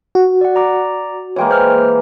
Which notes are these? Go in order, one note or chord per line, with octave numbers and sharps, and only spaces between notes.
F#4
D5 F#5
D5 A#5 D6
E3 G#3 A#3 C#5 G5
C5 F6